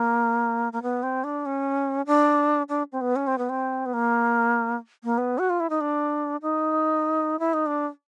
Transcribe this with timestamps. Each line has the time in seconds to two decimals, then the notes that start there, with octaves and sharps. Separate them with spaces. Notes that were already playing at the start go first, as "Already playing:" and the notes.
Already playing: A#3
0.73 A#3
0.82 B3
1.03 C4
1.24 D4
1.46 C#4
2.07 D4
2.69 D4
2.92 C4
3.01 B3
3.16 C#4
3.27 C4
3.38 B3
3.49 C4
3.86 B3
3.93 A#3
5.04 A#3
5.18 B3
5.38 F#4
5.50 F4
5.60 E4
5.70 D#4
5.81 D4
6.42 D#4
7.39 E4
7.53 D#4
7.66 D4